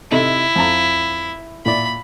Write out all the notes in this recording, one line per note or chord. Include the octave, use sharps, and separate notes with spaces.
C3 D#4 E4 A4
F2 A5 A#5
A#2 E4 D5 B5